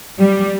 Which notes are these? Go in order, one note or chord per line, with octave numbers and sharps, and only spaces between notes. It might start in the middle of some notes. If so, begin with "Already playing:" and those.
G3